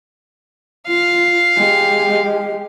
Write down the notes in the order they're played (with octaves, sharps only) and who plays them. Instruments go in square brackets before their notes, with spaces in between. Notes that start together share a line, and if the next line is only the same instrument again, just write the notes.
[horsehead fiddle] F4 [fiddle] F5
[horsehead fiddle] G#3 G4